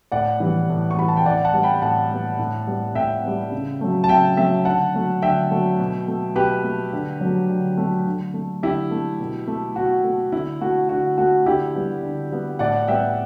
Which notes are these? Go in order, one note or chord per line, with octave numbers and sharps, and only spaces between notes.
A2 D5 F#5
E3 G3 B3
A2
C#6
E3 G3 B3 B5
A5
G5
A2 D5 F#5
F#5 A5
G3 B3
G5 B5
A2 F#5 A5
G3 B3
A2
G3 B3
A2 E5 G5
G3 B3
C#3
F#3 A3
A5
C#3 E5 G5
F#3 A3 E5 G5
D3 F#5 A5
F#3 A3
D3 E5 G5
F#3 A3
B2
A3
B2 G4 B4
A3
D3
F#3 A3
D3
F#3 A3
D3
A3
D3 E4 G4
A3
B2
A3
B2 F#4
A3
D3 E4
A3 F#4
D3 F#4
A3 F#4
D3 E4 G4
G3 B3
D3
G3 B3
A2 D5 F#5
G3 B3 E5 G5